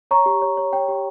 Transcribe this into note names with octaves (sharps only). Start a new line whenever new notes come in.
C#5 A#5 C#6
G4
C#5
C#5
C#5 G5
G4